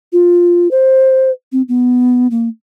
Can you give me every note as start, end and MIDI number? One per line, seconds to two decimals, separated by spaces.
0.13 0.71 65
0.71 1.31 72
1.52 1.62 60
1.69 2.28 59
2.31 2.49 58